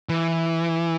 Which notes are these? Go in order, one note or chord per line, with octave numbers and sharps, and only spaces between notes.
E3